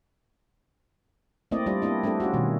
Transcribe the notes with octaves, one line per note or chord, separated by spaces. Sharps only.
A3 A#3 C4 E4 D5 D#5
G3 D4 F4 D5
A#3 B3 D4 E4 D#5
A3 C4 D4 G4 A4
C#4 F4 F#4
B2 D#3 G3